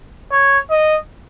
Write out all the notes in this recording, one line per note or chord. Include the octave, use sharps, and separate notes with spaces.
C#5
D#5